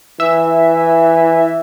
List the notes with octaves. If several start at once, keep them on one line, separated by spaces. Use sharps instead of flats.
E3 E5